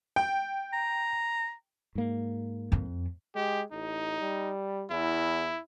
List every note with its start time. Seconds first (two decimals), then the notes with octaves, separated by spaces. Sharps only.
0.16 G5
0.73 A#5
1.95 G#2 A#3
2.72 F2
3.35 G#3 G4
3.72 A1 D#4
4.21 G3
4.91 E2 E4